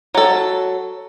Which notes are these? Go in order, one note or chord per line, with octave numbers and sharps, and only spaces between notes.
F#3 A4